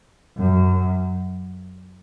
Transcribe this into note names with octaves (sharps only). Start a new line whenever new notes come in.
F#2